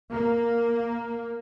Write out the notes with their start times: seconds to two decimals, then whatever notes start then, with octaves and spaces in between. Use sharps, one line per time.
0.12 A#3